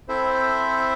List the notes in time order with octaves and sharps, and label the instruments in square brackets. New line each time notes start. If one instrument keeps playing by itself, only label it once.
[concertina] C4 E4 A4 C5 E5